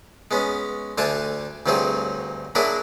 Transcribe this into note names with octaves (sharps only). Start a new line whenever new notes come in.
G#3 B3 C#4
D2 D3 D4 G#5 A5
D2 G2 F#3 C4 G#4
F#3 A#3 D4 E4 G#4